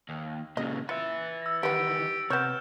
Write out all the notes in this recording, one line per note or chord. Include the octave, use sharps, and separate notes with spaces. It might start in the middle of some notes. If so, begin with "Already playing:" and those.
D#2
A#2 C#3 D#5
F4 B4 E5 A6 C#7
E6 A#6
D#3 E3 G3 B3 G4 C#7
C3 B3 C#5 F6 G6 E7